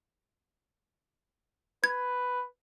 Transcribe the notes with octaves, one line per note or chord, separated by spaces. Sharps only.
B4 G#6